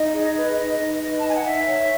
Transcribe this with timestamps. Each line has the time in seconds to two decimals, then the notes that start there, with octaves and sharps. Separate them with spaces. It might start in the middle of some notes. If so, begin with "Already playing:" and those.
Already playing: D#4 D#5
0.13 G#4
0.36 B4
0.56 D#4 D#5
0.78 D#4
1.01 B4
1.19 A5
1.22 D#4
1.28 G#5
1.35 F#5
1.44 D#4 E5
1.65 C#5